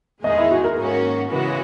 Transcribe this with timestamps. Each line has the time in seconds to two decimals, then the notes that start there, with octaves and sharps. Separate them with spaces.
0.24 E2 D#3 G#3 D#4 G#4 D#5
0.38 E4
0.51 F#4
0.64 A#4
0.77 G#2 D#3 A#3 C#4 F#4 A#4
1.30 C#3 E3 G#3 B3 F#4